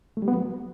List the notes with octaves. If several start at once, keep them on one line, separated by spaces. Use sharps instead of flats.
A3
G3
B3
F#3